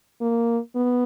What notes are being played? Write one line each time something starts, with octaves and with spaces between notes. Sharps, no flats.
A#3
B3